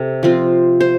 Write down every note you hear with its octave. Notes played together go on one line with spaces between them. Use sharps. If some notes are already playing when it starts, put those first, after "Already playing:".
Already playing: C3 A4
F3 C4 F4
C5